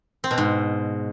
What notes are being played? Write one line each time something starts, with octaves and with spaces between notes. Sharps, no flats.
C4
B2
G#2